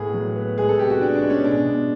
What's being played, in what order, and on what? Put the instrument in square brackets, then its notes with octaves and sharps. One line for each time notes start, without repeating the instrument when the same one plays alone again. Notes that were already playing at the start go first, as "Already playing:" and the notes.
Already playing: [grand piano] A2 B3 G#4
F#3
B3
G#3 G#4
A4
C3 G4
F#4
G#3 D4
D4
G#3
C#4
B2 D4
B2